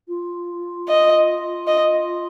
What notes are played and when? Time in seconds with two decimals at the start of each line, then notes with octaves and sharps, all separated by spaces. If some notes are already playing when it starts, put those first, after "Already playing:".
0.08 F4
0.88 D#5
1.68 D#5